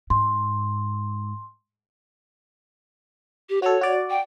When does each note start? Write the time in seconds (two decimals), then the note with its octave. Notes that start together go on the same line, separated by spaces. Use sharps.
0.10 G#2 C6
3.50 G4
3.62 F#4 A4 C#5
3.81 F#4 D5
4.10 G5